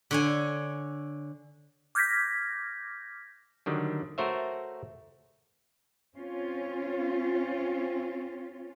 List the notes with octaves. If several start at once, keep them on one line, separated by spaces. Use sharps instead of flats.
D3 C#5 G#5
D6 F6 G6 G#6 A#6 B6
D3 D#3 F#3 G3
A3 F#4 A#4 C5 C#5 E5
C4 C#4 F4